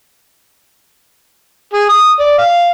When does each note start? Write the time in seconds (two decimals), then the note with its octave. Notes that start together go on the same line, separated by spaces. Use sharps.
1.73 G#4
1.89 D#6
2.20 D5
2.38 F5